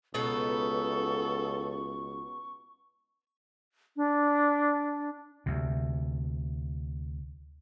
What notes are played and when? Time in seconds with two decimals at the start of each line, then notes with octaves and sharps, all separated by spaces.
0.14 C#2 B2 B3 D#4 A4 C#6
3.96 D4
5.46 D2 C3